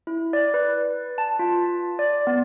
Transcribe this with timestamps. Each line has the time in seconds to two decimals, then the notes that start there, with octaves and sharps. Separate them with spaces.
0.07 E4
0.33 D5
0.54 B4
1.18 A5
1.39 F4
1.99 D5
2.27 B3